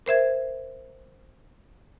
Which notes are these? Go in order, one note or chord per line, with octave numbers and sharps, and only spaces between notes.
A#4 C5 E5 G#6